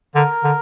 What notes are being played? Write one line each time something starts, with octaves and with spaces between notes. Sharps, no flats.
D3 A#4
D3